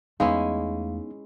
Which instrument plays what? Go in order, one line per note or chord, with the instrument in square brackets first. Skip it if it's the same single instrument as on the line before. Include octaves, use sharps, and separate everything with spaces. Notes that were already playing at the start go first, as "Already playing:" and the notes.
[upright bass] E2 A3 [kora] G#3 C#4 E4 [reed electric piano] B3 D#4 [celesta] F5